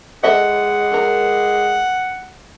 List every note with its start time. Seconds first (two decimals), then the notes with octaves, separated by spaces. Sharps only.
0.23 G#3 A4 D#5 E5 F#5
0.92 A4 A#4